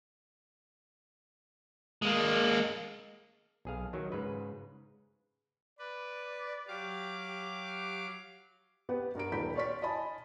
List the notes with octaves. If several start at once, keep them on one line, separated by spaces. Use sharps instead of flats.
G#3 A#3
B1 G#4 F5
D#3 F#3
G#2 C#3 B4
B4 D5
F#3 G4 F5 D6
G4
B3 G4 B4 F#5
G2 A#4 A#5 D7
D#1 B4 A#5 B5 G6 B6
C#5 D5 C6 C#6 F6 B6
D#5 G#5 A5 B5